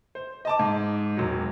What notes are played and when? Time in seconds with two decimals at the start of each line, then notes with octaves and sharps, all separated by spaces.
0.15 C5
0.45 D#5 A5 D6
0.59 G#2
1.17 E1 F#3